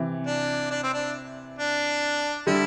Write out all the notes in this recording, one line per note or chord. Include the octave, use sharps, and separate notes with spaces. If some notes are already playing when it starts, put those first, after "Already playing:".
Already playing: C3 E3
D4
D4
C4
D4
D4
D3 G3 E4